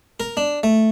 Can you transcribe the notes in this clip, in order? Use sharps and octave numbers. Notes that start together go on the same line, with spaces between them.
A#4
D4
A3